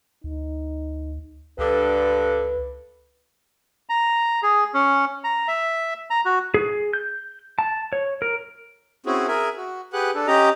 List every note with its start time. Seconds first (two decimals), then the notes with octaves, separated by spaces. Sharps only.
0.24 D2 D#4
1.59 C#2 G2 D3 B4
3.89 A#5
4.43 G#4
4.74 C#4
5.24 A#5
5.48 E5
6.10 A#5
6.25 F#4
6.54 G#4
6.93 G6
7.59 A5
7.93 C#5
8.22 A#4
9.06 C4 C#4 E4 F#4 G#4
9.28 G#4 A#4 E5 G#5
9.57 F#4
9.93 G4 G#4 B4 F#5 F#6
10.15 D4 A4
10.27 C#4 G4 D#5 A#5